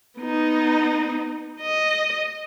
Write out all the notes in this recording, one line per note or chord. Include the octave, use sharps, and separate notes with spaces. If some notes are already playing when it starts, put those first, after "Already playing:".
B3 D#4
D#5